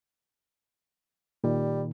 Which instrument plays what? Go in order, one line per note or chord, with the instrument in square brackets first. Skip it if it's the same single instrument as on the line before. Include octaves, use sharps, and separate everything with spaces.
[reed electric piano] A#2 D#3 [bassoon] G3